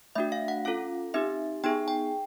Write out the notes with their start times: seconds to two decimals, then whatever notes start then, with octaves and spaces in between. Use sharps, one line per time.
0.15 A3 D4 F#4 E5
0.32 F5
0.48 F#5
0.65 C#4 F4 A4 F5
1.14 C4 D#4 G4 E5
1.64 B3 D#4 G#4 G5
1.88 G5